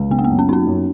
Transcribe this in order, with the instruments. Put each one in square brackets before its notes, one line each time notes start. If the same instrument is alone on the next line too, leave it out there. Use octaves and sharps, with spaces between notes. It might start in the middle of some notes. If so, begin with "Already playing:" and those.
Already playing: [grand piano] C#2
[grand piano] C#3 [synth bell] B3
[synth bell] A#3
B3
[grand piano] F#2
[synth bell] C#4
[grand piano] F#3 [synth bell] C#4 D#4
[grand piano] F#2